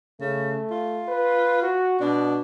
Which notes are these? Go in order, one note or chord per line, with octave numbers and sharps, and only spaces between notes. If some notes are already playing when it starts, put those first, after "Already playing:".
C#3 A3
F4
B4
F#4
B2 D4